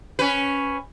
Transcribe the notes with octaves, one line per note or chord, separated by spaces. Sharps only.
C#4 B4